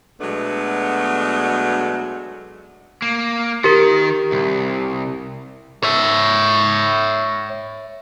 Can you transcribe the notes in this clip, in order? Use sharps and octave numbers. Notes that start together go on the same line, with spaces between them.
B2 F#3 G#3 A3 B3 D4
A#3
D#3 G4 A#4
C2
C#5 E5